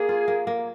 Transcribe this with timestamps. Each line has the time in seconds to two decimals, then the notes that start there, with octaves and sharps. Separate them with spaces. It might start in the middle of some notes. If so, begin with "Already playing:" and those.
Already playing: A#3 G#4
0.09 F4
0.28 A#3
0.47 A#3